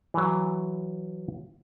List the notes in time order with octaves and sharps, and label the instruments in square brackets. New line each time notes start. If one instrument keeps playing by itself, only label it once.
[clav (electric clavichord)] E3 F#3